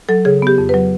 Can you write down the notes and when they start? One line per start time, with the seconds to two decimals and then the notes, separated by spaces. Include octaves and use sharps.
0.09 F#3 A4
0.25 C#3 G#4
0.42 B3 G4
0.58 F2
0.69 F#3 B4